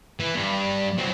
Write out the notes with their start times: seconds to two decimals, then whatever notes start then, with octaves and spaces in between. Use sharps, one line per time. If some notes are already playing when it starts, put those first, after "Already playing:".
0.20 E3
0.35 G2
0.98 F#3 C4